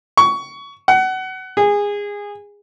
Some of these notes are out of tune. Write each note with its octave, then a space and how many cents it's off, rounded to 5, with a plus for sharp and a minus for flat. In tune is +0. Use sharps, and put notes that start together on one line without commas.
C#6 +20
F#5 +25
G#4 -20